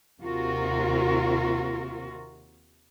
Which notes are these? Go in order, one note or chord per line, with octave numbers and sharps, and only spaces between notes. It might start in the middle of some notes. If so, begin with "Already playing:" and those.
D#2 C3 F4 F#4 A#4